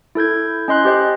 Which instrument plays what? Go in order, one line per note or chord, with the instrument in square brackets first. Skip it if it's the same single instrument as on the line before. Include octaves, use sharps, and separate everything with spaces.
[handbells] E4 A4 G6 G#6
C#4 D#5 C6 F#6
G4 C5 D#5